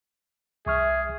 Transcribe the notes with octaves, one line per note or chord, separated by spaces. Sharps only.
C2 G#4 E5 C#6 F6